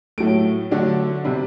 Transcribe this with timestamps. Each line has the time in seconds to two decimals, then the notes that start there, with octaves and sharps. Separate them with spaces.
0.18 A2 F#3 A3 D7
0.71 D3 F#3 A3 D4
1.24 C3 G3 D4